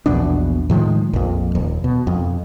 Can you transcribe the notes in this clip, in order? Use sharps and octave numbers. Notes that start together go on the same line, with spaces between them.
A#1 E2 B2 D4
A2 D#3 F3 G#3
A#1 F2
D#1
B2
F2